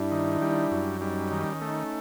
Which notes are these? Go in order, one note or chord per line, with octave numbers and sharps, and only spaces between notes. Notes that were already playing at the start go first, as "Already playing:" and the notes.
Already playing: G2 D4 E4
D#3
G3
F#2
G3 C#4 D#4
D#3
A3